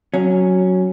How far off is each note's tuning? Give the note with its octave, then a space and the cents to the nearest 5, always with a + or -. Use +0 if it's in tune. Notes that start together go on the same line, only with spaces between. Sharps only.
F#3 +0 C#4 +0